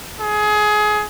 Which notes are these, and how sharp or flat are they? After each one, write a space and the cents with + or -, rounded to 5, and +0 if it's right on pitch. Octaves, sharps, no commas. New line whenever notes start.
G#4 +25